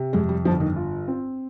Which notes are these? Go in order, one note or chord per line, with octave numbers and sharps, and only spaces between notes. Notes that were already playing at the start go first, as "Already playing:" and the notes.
Already playing: C3
F2 G#3
G3
G1 F3
D#3
F4
C4